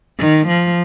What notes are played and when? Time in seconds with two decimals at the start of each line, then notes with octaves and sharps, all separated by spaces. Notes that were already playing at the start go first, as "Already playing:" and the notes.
0.19 D#3
0.48 F3